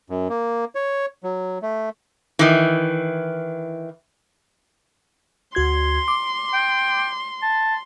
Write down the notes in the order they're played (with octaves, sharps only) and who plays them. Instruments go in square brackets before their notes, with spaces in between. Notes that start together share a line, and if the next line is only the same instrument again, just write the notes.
[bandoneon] F#2
A#3
C#5
F#3
A3
[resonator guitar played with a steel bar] D#3 E3
[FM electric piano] D2 F#4 G#6 [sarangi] C6
[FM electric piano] D6
[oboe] G5
A5